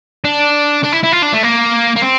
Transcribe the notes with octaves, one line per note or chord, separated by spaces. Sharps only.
D4
D4
E4
E4
F4
D4
A3
A#3
A#3
C4